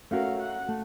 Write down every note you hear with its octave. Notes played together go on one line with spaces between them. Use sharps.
A3 C#4 F#4 A#4 F5
F#5
A3